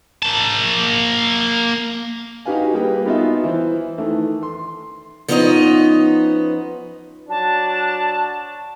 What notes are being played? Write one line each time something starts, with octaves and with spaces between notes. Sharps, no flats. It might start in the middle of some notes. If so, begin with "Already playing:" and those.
A#3 A5
D#4 F#4 G4 B4 F5 G#5
G3 A#3 G#4 B4 G5
B3 D#4 F4 F#4 E5
E3 E4 C5
D#3 E3 A3
C6
F3 B3 C#4 D#4 D5 D#5
F#3 D4 A5